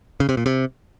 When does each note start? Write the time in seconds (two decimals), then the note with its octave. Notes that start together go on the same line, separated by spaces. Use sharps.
0.20 C#3
0.29 C3
0.37 A#2
0.46 C3